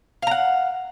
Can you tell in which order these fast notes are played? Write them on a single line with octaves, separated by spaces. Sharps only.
F5 A#5 F#5